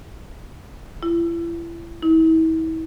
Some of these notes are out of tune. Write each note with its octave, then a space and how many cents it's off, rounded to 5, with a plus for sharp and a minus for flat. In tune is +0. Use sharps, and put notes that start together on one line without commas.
E4 +35
E4 -40